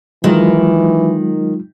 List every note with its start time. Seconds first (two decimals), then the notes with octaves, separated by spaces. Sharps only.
0.24 D#3 E3 F#3 G#3 F4